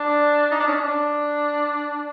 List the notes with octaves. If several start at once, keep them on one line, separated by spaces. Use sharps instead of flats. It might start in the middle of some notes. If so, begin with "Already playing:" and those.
Already playing: D4
D#4
D4
C#4
D4